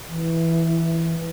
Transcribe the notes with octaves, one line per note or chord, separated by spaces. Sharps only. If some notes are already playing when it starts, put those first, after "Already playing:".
E3